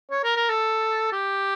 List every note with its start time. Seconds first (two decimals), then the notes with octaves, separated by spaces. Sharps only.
0.11 C#5
0.24 A#4
0.37 A#4
0.49 A4
1.13 G4